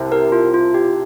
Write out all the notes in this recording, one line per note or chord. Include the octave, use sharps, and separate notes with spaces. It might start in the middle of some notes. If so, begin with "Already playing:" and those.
Already playing: C2 C3
G4 A#4
F4
F4
G4